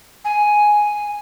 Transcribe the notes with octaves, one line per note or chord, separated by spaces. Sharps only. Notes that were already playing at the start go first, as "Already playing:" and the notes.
G#5